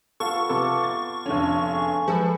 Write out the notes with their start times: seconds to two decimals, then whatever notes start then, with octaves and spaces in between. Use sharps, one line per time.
0.20 B3 F4 A4 C#6
0.49 C3 B3 A4 D6
0.84 A6
1.26 F1 D3 C#4 A4
1.72 G#4
2.08 F3 G#3 A4 B4